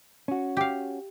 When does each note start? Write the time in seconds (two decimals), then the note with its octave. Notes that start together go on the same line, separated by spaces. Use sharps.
0.28 C#4 F#4
0.57 G4 F5